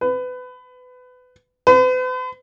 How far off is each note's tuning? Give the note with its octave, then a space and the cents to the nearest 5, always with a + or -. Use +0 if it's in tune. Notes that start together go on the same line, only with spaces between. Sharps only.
B4 +25
B4 +45